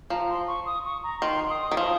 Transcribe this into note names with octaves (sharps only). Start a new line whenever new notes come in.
F3 A#5
C6
C#6
D#6
C#6
A#5
D#3 C6
D#6
D#3
F3